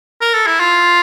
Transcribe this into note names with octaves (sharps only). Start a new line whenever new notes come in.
A#4
A4
E4
F4